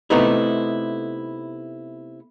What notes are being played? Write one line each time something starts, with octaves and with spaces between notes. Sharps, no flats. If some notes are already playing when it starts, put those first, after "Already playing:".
C3 A3 B3 D#4 E4